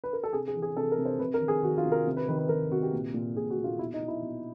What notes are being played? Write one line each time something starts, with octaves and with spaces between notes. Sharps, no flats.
B4
A#4
A4
C3 G#4
G#4
E3
G#4
C3 A4
A#4
C3
C5
C3 B4
A#4
D#3
G#4
D#3 F#4
F4
C3
A#4
C3
B4
D#3 B4
B4
D#3 A#4
C3 F#4
G4
A#2
A#2
A#2 G#4
F#4
A#2
F4
B2 E4
D#4
B2
E4
B2